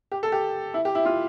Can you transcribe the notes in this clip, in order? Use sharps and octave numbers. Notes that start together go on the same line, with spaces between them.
G4
A4
G4
E4
G4
E4
F4